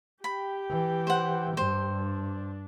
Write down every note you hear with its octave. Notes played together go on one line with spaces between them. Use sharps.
G4 G5 B5
E3
C5 F#5
G2 C5
D4